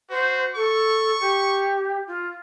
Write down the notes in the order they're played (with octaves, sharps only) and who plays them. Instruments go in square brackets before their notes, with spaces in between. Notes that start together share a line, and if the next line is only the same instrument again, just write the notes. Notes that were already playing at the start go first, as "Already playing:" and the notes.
[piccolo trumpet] F#4 [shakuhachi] C5
[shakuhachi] A4 [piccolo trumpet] C#6
[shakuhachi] G4
F4